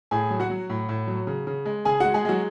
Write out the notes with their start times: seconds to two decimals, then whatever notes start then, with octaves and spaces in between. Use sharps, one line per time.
0.11 A2 G#4 G#5
0.31 F#3
0.40 F#4 F#5
0.50 F#3
0.70 A2
0.89 A2
1.08 F#3
1.27 C#3
1.47 C#3
1.66 G#3
1.85 C#3 G#4 G#5
2.00 G#3 F#4 F#5
2.14 G#3 G#4
2.25 F#3 G#3 F#4